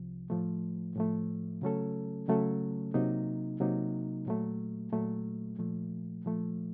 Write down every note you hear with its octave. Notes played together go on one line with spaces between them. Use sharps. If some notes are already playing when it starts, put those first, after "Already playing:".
Already playing: C2 C3 F3
A2 F3 A3
A2 F3 A3
C#3 F#3 A3 C#4 A4
C#3 F#3 A3 C#4 A4
C3 F#3 A#3 D#4
C3 F#3 A#3 D#4
A#2 F#3 A3
A#2 F#3 A3
A#2 F3 A3
A#2 F3 A3